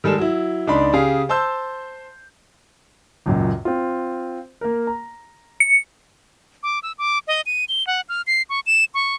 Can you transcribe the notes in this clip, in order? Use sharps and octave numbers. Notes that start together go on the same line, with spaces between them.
D#3 G3 G#3 A4 E7
F#3 E4
C#2 D4 D#4 D5 B5 C6
C#3 G4 G#4 F5
C5 A5 C6 E6 G6
C#2 F#2 A#2
C4 F4
A#3 A#4
A#5
C#7
D6
E6
D6
D#5
D#7
G7
F#5
F6
C7
C#6
E7
C#6